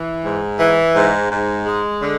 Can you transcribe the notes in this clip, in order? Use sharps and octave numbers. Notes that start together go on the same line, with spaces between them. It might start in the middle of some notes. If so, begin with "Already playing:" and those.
Already playing: E3
G#2
E3
G#2
G#2
G#3
D3